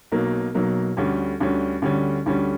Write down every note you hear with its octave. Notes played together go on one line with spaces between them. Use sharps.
B1 B2 F#3 A#3
B1 B2 F#3 A#3
D2 D3 G3 C#4
D2 D3 G3 C#4
D2 D3 G3 C#4
D2 D3 G3 C#4